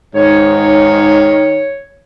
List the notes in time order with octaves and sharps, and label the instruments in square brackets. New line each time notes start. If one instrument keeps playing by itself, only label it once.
[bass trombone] G#2 [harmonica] D#3 [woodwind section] C#5